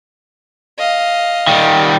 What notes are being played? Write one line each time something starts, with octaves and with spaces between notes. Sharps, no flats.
D#5 F5
D#3 G3